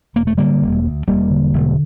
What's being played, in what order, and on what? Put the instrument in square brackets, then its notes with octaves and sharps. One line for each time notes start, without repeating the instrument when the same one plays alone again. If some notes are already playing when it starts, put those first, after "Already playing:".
[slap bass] E1 A#3
A3
D3 G3 A#3
E1
D2
E1 G3 A#3
D3
E1